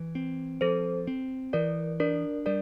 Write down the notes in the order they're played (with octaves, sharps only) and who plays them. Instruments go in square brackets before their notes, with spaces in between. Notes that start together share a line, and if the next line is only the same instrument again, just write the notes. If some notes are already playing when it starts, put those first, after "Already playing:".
Already playing: [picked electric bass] E3
C4
[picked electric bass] F3 [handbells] A4 C5
[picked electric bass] C4
[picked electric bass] E3 [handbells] A#4 D5
[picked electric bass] D4 [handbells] A#4 D5
[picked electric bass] G3 [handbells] A#4 D5